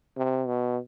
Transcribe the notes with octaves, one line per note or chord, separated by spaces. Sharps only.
C3
B2